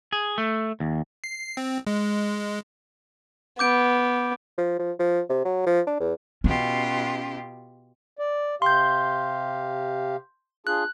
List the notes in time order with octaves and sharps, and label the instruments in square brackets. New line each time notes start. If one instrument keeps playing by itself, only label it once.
[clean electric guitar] G#4
A3
D#2
[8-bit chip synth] C7
C4
G#3
[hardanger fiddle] B3 [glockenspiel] D6 G6 D7
[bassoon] F3
F3
F3
C3
F#3
F3
D4
E2
[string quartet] B2 F4 G4 [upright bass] C#4
[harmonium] D5
[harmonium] C3 G4 F5 [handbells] C6 G6
[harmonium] D4 F4 G#4 [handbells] F#6